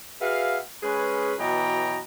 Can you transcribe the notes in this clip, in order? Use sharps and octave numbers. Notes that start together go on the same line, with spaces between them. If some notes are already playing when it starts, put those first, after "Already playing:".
F#4 G#4 B4 E5 F5
G#3 C#4 G#4 B4
B2 E3 F#3 D#5 G5 A#5